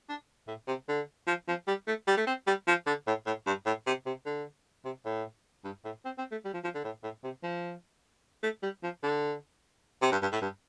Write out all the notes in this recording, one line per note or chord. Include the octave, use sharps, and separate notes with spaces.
D4
A2
C3
D3
F3
F3
G3
A3
G3
A3
C4
G3
F3
D3
A2
A2
G2
A2
C3
C3
D3
C3
A2
G2
A2
C4
C4
A3
G3
F3
F3
D3
A2
A2
C3
F3
A3
G3
F3
D3
C3
G2
G2
A2
G2